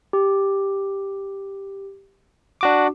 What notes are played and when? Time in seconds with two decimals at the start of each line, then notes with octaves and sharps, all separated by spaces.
0.13 G4
2.61 D4 F#4 D6